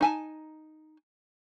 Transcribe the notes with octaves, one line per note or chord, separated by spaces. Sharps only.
D#4 G#5 A5